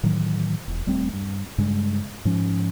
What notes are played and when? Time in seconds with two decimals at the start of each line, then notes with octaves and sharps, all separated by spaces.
0.03 A2 D#3 E3 F#3
0.68 E1
0.86 D#1 G3 A3 C4
1.13 G2
1.58 G2 C#3 G3 G#3
2.25 G#2 F3 C#4